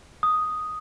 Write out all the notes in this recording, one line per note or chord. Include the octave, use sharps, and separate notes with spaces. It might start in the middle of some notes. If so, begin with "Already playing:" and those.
D#6